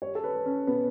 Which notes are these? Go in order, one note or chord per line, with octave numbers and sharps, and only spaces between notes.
G3 C#5
A4
B4
G3
C#4
B2 B3